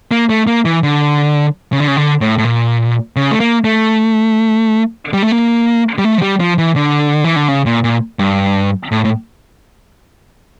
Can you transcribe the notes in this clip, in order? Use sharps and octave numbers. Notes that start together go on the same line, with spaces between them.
A#3
A3
A#3
E3
D3
C#3
D3
C#3
D3
A2
A2
A#2
C#3
A3
A#3
A3
G3
A3
A#3
G3
A3
F3
G3
F3
E3
D3
E3
D3
C#3
A#2
A#2
G2
A2
A2